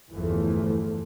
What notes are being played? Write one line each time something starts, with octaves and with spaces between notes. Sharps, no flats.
G1 E2 E3 F3 A3